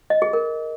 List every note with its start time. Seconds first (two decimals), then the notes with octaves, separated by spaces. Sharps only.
0.10 D#5
0.22 G#4
0.33 A#4